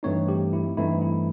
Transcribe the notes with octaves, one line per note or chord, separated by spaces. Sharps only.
G2 E3 A3 C4 D#4 C#5
G4
E4
G2 E3 A3 C4 D#4 E4
E4